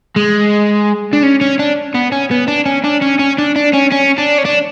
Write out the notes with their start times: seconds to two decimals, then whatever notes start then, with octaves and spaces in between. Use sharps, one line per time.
0.16 G#3
1.13 D4
1.23 C#4
1.41 C#4
1.59 D4
1.95 B3
2.12 C#4
2.31 B3
2.48 D4
2.66 C#4
2.84 D4
3.02 C#4
3.19 C#4
3.38 D4
3.56 D4
3.73 C#4
3.92 C#4
4.18 D4
4.38 C#4
4.45 D4